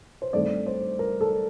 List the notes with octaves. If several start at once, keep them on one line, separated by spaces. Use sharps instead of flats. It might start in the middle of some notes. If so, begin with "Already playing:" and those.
C5
G2 D#3 A3 C4 D5
C5
A#4
A4